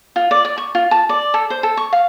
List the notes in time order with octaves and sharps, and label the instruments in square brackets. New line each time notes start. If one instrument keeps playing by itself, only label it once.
[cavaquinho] F4
D5
D5
C#6
F4
A5
D5
A4
C5
A4
C#6
F5